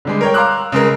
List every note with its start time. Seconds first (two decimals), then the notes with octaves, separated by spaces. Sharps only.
0.05 D3 G3 G#3
0.21 A#4 C#5 G5
0.34 F5 A#5 C6 D6 E6 F#6
0.72 C#3 G#3 A#4